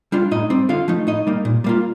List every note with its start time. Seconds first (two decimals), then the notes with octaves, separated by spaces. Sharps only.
0.12 G3 D4 F4
0.31 A2 D#4 D#5
0.50 G3 C4
0.69 D3 F4 F5
0.88 F3 A3 D#4
1.07 A2 D#4 D#5
1.27 G3 A#3 D#4
1.45 A#2
1.64 G3 A#3 F4